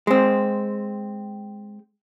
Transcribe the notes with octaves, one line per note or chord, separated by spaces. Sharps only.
G#3 C4